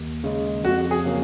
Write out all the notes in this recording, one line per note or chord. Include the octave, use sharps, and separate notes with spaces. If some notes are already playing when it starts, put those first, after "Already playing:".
Already playing: D#2
C#3 G#3
F2 F#4
G#4
C#3 F#3 A#3